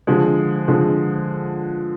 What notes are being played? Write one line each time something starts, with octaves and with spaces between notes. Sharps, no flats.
D3 F3 G#3
D3 F3 G#3